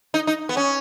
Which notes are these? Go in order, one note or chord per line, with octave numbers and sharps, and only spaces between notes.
D#4
D#4
B3
C#4